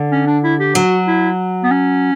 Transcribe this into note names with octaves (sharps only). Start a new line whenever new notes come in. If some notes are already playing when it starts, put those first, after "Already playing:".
Already playing: D3
C#4
D4
E4
G4
F#3 F#4
E4
B3
C#4